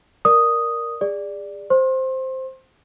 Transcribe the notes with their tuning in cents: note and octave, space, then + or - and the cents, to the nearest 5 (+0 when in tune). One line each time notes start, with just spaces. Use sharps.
A#4 +0 D5 +0 D#6 +0
G#4 -30 D5 +0
C5 +0 C6 +30